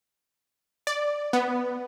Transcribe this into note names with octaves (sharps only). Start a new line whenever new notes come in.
D5
B3